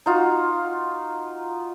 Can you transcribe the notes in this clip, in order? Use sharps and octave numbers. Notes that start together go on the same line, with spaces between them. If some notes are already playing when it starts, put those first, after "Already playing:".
D#4 F4 F#4